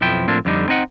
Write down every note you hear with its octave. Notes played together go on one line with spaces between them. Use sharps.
B1 F2 F3 E4 G5
A2 F3 A#3 C4 D4
F2 D3 G3 D#4
C4 D#4 D#5 F#5